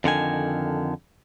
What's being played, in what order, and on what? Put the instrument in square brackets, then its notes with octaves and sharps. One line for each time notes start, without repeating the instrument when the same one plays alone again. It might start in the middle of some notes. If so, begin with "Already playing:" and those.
[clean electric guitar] F2 D3 D#3 G#5